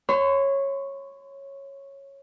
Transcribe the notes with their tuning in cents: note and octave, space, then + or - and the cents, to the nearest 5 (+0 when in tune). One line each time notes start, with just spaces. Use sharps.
C#5 -10 C6 -45